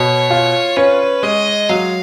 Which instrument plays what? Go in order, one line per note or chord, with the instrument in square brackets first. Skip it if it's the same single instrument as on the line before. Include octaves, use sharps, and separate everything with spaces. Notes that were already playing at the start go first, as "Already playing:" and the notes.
Already playing: [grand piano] B2 [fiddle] C#5
[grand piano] F4
[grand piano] C#4 [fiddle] B4
[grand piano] G#3 [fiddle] D#5
[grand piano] F#3 [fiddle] F5